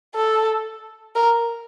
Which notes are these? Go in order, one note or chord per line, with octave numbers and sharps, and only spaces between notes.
A4
A#4